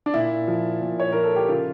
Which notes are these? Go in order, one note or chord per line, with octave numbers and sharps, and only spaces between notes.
D4
A#2 E4
F3
A#2
C#5
F3 A#4
A4
G4
C#3 F4